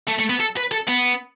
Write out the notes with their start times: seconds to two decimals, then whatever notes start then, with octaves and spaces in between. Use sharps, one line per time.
0.09 A3
0.19 A3
0.30 B3
0.40 A4
0.57 B4
0.72 A4
0.88 B3